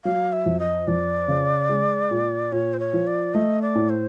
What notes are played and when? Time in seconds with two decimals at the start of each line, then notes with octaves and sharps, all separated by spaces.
0.04 F#3 F5
0.33 E5
0.46 F2
0.60 D#5
0.88 F2 D5
1.28 C#3
1.69 G#3
2.11 A#2
2.52 A#2 C#5
2.74 C5
2.80 C#5
2.93 F3
3.07 D5
3.34 A3 D#5
3.62 D5
3.75 A2
3.90 C5